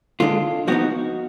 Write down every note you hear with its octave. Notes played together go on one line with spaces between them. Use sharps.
D3 G#3 D4 F4
F3 B3 D#4 F#4